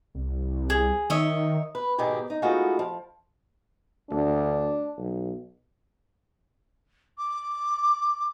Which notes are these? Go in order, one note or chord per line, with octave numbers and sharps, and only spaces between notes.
C2
G#4
D#3 C#5 D#5 E5
B4
G#2 B2 D#3 G4 G#4
D#4
G#3 A3 B3 D#4 F4 F#4
F3
D2 D4
B1
D6